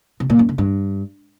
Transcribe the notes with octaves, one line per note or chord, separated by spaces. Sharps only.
C3
A#2
F#2
C#3
G2